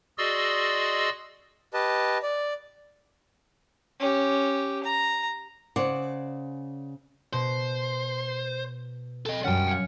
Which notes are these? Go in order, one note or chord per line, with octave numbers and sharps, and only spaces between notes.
F#4 G#4 D5 D#5 C6 E6
G4 B4 D#5 A5
D5
C#4 G4
A#5
C#3 C5 D5 F#5
B2 C5
A4 D#5
F#2 G3 C#4 F#5 G5
F5 G#6 C#7